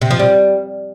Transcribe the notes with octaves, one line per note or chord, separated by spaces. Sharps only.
C3
F3
G3